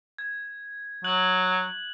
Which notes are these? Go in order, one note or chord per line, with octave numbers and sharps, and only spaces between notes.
G#6
F#3 F#6 G#6 F#7